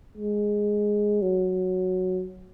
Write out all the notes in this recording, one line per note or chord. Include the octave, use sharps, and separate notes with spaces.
G#3
F#3